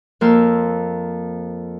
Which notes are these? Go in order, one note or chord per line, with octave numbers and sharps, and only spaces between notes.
F2 A#3 A#4 C5 F5 E6